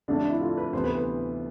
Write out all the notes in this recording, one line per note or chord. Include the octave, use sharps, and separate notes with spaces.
F2 D3 A3 D4
D4
E4
F4
B4
D2 C3 E3 B3 C5
B4
B4